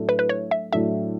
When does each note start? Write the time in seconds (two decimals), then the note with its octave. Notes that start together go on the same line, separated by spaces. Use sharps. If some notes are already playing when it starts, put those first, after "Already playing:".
Already playing: A2 F#3 A3 D4 A4
0.09 B4
0.19 B4
0.29 C#5
0.51 E5
0.72 A2 F#3 A3 D4 A4 E5